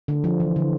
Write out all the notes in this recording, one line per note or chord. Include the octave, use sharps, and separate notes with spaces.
D3
F3
E3
D3